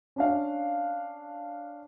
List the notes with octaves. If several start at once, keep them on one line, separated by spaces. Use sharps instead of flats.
C#4 D4 F5